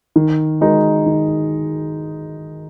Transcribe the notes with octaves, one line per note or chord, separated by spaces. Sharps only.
D#3
G#3 D#4 F#4 A#4
D#3